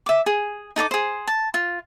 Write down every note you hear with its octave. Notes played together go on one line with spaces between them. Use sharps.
E5 D6
G#4
D#4 A4 D5 D6
G#4 C5
A5
F4